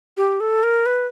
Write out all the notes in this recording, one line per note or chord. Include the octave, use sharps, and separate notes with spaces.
G4
A4
A#4
B4